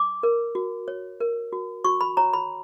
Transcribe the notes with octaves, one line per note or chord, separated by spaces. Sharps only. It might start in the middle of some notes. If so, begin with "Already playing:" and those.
Already playing: D6
A#4
F#4
C#5
A#4
F#4
F#4 C#6
B5
C#5 A#5
B5